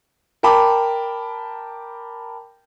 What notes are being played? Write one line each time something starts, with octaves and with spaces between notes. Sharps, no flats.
A#4 G5 A5 B5 D6